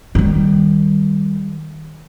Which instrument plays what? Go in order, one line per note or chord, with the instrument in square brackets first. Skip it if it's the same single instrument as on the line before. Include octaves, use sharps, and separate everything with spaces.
[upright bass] D#3 G3